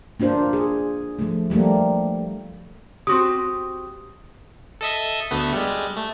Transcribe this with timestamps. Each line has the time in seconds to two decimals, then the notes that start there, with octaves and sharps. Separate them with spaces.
0.20 A#3 D4 F4 C5
0.53 G#4
1.19 F3 A3
1.50 F3 G3 A3 A#3
3.07 C4 F#4 G4 D#6
4.81 A4 D#5 E5
5.31 D2 A3 B3
5.52 G3 G#3
5.96 A3